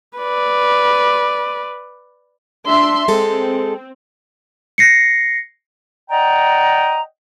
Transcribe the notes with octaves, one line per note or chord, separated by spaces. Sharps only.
B4 D5
D4 E5 C6
G#3 C4 A4
A#6 C7 C#7
D5 D#5 F#5 G5 A#5